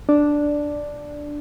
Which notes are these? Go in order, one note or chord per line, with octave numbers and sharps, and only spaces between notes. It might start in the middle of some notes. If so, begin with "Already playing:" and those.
D4